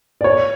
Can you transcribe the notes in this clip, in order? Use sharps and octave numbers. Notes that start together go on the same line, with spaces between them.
D5
C#5